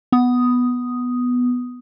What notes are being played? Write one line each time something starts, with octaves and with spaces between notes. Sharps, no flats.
B3 D#6